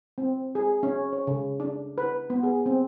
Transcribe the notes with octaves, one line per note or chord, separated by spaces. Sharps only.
C4
G#4
C#4
C#5
C#3
D4
B4
B3
G#4
C4